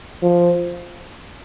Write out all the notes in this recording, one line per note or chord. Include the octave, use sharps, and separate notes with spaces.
F3